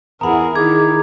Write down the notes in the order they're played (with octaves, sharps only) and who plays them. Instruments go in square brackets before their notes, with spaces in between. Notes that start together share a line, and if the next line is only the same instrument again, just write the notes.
[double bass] E2 E4 [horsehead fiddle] G#4 A#4 [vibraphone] F#5 D#6 [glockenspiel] A#5 B5
[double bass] D#3 D#4 [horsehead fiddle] E4 [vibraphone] G#4 A#5 D6 [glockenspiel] G#6